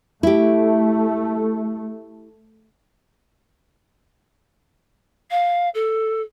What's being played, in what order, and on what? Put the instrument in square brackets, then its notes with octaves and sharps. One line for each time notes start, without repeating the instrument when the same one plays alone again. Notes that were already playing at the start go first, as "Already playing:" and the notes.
[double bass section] A3 [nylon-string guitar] E4 G4
[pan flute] F5
A4